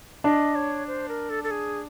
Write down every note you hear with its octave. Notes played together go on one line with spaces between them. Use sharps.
D4 D#5
C#5
C5
A#4
A4
A4
G#4